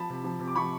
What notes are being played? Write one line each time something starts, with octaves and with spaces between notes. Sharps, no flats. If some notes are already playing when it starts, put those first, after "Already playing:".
Already playing: F3 A5 B5
C3
F3
C3
D6
F3 B5 C#6